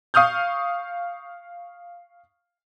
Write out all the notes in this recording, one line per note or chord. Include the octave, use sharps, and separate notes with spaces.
F5 C#6 D#6 F6 G6